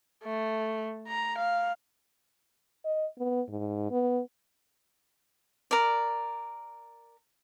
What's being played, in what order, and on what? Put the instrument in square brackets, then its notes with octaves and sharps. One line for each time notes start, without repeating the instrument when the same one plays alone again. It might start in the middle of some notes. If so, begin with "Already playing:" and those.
[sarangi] A3
A#5
F5
[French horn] D#5
B3
G#2
B3
[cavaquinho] A#4 D5